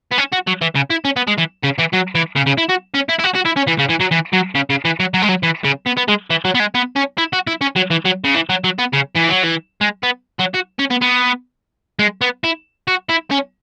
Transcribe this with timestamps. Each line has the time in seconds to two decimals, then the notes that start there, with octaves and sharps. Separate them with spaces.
0.11 B3
0.18 C#4
0.32 F#4
0.47 F#3
0.61 E3
0.75 C#3
0.90 E4
1.05 C#4
1.16 B3
1.27 G#3
1.38 E3
1.63 C#3
1.78 E3
1.93 F#3
2.15 E3
2.36 C#3
2.47 C#3
2.58 E4
2.69 F#4
2.95 C#4
3.09 E4
3.19 E4
3.24 F#4
3.35 F#4
3.46 E4
3.57 C#4
3.68 E3
3.79 C#3
3.90 E3
4.01 F#3
4.12 E3
4.33 F#3
4.55 C#3
4.70 C#3
4.85 E3
5.00 F#3
5.14 F#3
5.22 G#3
5.29 F#3
5.43 E3
5.65 C#3
5.87 B3
5.97 B3
6.09 G#3
6.30 E3
6.45 F#3
6.55 B3
6.60 G#3
6.75 B3
6.96 C#4
7.18 E4
7.33 F#4
7.47 E4
7.61 C#4
7.76 F#3
7.91 E3
8.05 F#3
8.25 C#3
8.35 E3
8.50 F#3
8.64 F#3
8.79 B3
8.93 C#3
9.15 E3
9.29 F#3
9.43 E3
9.81 G#3
10.03 B3
10.39 F#3
10.54 F#4
10.79 C#4
10.90 B3
11.01 B3
11.99 G#3
12.21 B3
12.44 E4
12.88 F#4
13.09 E4
13.31 C#4